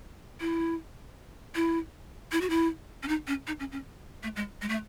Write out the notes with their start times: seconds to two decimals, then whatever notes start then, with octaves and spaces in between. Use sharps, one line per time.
0.40 E4
1.55 E4
2.32 E4
2.41 F#4
2.50 E4
3.03 C#4
3.08 D#4
3.27 C#4
3.47 D#4
3.60 C#4
3.72 C#4
4.23 A3
4.36 G#3
4.62 G#3
4.69 A3